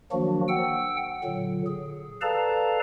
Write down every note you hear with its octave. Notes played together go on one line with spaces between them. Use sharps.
D#3 F3 F#3 A#3 D4 F#4
F#5 G5 E6
A#2 D3 F#3
G#4
A4 B4 D5 F5 A5 A#5